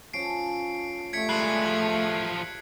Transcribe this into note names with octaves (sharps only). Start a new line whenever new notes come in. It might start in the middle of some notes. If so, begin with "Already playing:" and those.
F3 C#4 A4 C7 D7
A3 D4 F4 G4 G#6 B6 C#7
G3 G#3 G#4 A4 F#6 C7 F#7
A2 F3 G#6